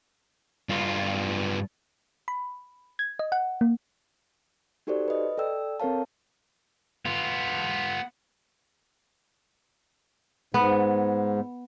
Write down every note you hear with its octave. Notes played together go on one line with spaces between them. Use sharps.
G2 F4
B5
G#6
D#5
F#5
A#3
D#4 F#4 G4 A4 C5 D5
B4 D#5
A4 D5 G5 E6
C4 A4 A#4 C#5 F5 A5
B3 F4
G#2 B3